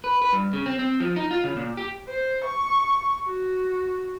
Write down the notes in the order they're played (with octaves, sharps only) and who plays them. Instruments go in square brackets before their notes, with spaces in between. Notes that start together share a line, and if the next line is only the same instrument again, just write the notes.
[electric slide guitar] B4
B4
G2
C#3
C4
C4
F3
D#4
F4
C#3
A#2
G4
[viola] C5
C#6
F#4